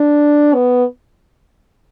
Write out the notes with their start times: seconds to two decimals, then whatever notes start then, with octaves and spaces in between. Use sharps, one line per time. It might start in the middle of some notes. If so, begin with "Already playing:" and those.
Already playing: D4
0.54 B3